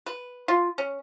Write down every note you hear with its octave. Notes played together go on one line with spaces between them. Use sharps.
B4
F4
C#4